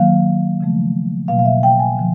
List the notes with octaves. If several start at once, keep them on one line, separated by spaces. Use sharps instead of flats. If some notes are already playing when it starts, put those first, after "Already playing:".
Already playing: D#3 F#3 A#3 F5
C#3 F3 A3
B2 F#3 A#3 F5
F5
E5
G5
G#5
D3 F3